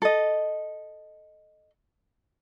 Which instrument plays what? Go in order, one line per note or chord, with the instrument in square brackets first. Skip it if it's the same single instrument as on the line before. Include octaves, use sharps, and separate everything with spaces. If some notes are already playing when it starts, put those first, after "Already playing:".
[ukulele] A4 D#5